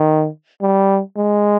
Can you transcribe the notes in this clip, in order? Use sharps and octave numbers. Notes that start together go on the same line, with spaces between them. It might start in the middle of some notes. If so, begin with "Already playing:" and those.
Already playing: D#3
G3
G#3